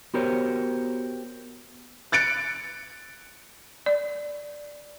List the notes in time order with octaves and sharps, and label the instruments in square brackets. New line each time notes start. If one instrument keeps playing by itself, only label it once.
[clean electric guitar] B3 F#4 G4 A#4 C5 C#5
[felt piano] F#6 A6 C#7 D7
[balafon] D5